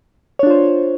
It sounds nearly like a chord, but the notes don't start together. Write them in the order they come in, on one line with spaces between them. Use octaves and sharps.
C#5 D4 F4 C5